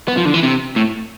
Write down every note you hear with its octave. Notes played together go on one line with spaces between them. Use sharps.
B3
F3
D3
E3
C3
A2